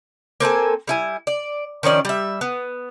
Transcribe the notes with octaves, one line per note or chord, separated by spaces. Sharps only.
A#3 C4 A4 G#5
G3 E4 G#5
D5
D#3 F3 C#4 D5
G3 E5
B3